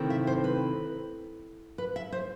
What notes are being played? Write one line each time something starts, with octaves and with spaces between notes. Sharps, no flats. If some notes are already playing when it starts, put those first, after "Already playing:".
Already playing: C3 D#3 A3 C4 E4
E5
C5
B4
B4
E5
C5